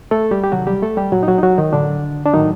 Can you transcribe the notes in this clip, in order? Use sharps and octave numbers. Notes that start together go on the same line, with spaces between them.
A3 A4
G3 G4
G4
C3 D#3 F#3 F#4
G3 G4
A3 A4
G3 G4
A#2 F#3 F#4
D#4
F#3 F#4
D#4
F#3 F#4
D#3 D#4
A2 D3 F#3 D4
D4
A2 D#3 F#3 D#4